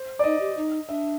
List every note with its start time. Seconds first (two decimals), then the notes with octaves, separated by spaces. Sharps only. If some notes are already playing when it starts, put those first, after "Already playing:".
Already playing: C5
0.19 D5
0.24 D#4 D#5
0.40 G4
0.57 D#4
0.89 D4 E5